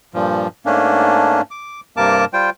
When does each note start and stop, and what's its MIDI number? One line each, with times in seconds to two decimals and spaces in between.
0.14 0.48 43
0.14 0.48 46
0.14 0.48 53
0.66 1.41 44
0.66 1.41 57
0.66 1.41 58
0.66 1.41 61
0.66 1.41 62
1.51 1.80 86
1.97 2.25 43
1.97 2.25 48
1.97 2.25 58
1.97 2.25 70
1.97 2.25 81
1.97 2.25 86
2.33 2.50 55
2.33 2.50 65
2.33 2.50 72
2.33 2.50 79